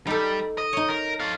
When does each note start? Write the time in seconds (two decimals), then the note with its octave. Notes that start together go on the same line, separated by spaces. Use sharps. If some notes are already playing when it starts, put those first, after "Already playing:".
0.07 G3 D#4 A4
0.58 D#5
0.73 D#4 C#5
0.89 A#4
1.20 A4 F5